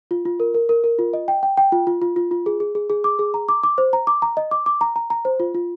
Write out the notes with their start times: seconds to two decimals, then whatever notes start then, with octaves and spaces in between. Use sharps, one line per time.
0.11 F4
0.25 F4
0.40 A#4
0.54 A#4
0.69 A#4
0.84 A#4
0.99 F4
1.13 D#5
1.28 G5
1.43 G5
1.57 G5
1.72 F4
1.87 F4
2.02 F4
2.16 F4
2.31 F4
2.46 G#4
2.60 G#4
2.75 G#4
2.90 G#4
3.04 D6
3.19 G#4
3.34 A#5
3.49 D6
3.63 D6
3.78 C5
3.93 A#5
4.07 D6
4.22 A#5
4.37 D#5
4.51 D6
4.66 D6
4.81 A#5
4.96 A#5
5.10 A#5
5.25 C5
5.40 F4
5.55 F4